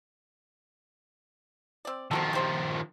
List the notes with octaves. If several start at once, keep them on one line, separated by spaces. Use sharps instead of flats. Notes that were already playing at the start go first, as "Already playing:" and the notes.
C4 D5
D#3 F3 C4 F#4 A4
G4 C5 G5